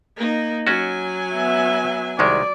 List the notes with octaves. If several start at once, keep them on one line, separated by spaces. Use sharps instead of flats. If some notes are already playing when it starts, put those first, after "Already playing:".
A#3 D#4
F#3 C#4 F#4 G#5
B3 E5
C2 D#3 G#3 D5